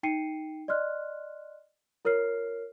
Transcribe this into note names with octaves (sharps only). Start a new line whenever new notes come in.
D#4 G5 C7 C#7 D#7
D5 D#5 C6 F6 F#6
F4 A#4 C#5 F6 C7